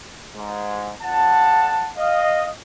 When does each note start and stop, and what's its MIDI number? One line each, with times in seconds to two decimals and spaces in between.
0.36 0.90 44
1.02 1.88 41
1.02 1.88 78
1.02 1.88 81
1.97 2.46 75
1.97 2.46 77